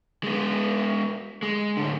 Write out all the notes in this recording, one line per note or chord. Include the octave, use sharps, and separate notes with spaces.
G#3 B3
G#3
A2 D3